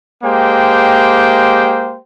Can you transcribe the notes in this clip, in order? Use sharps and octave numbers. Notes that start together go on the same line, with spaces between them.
G#3 A#3 G4 C5 G5